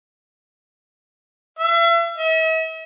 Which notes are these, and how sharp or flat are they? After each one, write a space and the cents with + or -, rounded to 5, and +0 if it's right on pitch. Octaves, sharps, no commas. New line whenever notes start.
E5 +40
E5 -45